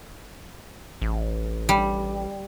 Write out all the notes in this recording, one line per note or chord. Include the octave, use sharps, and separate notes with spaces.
A1
G3